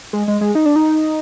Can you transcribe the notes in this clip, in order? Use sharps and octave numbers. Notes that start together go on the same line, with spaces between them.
G#3
G#3
G#3
D#4
D4
D#4